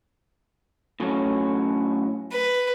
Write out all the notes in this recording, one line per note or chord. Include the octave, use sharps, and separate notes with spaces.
A2 F#3 C#4
B4